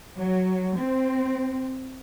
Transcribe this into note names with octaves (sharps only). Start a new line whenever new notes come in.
F#3
C4